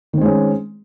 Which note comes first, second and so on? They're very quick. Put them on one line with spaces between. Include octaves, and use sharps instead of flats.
D#3 C4 G#3 C#4